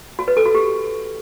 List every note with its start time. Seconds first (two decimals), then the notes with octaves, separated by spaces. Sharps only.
0.19 F#4
0.28 B4
0.37 A4
0.46 F#4
0.55 G4